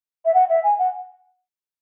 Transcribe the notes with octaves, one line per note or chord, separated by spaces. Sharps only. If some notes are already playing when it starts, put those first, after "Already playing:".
E5
F#5
E5
G#5
F#5